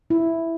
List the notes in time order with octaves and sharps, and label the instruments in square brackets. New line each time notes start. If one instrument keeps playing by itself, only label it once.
[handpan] E4